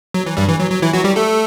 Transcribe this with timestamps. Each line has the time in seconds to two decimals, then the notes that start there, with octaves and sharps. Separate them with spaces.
0.14 F#3
0.26 E3
0.37 G2 G3
0.48 E3
0.60 F#3
0.71 F#3
0.82 E3 E4
0.93 F#3 F#4
1.04 G3 G4
1.16 A3 A4